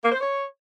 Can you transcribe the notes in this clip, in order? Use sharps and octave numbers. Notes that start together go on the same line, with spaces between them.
A#3
C5
C#5